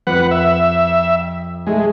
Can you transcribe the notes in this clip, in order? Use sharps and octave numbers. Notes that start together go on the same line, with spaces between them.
F2 B4 F#5 C#7
E5
G#3 A3 G#4